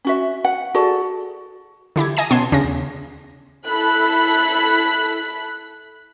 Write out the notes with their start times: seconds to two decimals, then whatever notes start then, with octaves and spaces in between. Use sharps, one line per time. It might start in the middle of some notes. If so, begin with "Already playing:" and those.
0.05 C#4 F#4 E5
0.45 F#5
0.75 F#4 G#4 A4 D5
1.96 D3 E4 G4 G#6
2.17 D#5 G#5 A#6 D#7
2.31 B2 B3 C#4 A5 C6 G#6
2.52 D#2 C#3 C#4 D4 A#6
3.67 E4 A4 B5 F#6 B6